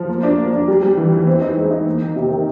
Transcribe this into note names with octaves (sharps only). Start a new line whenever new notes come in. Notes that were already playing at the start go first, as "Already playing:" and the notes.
Already playing: F3
A#3
D4
A#3
D4
G3
G3
E3
E3
C4
D#4
G#3
D#4
A#3
D#3
C3
D#3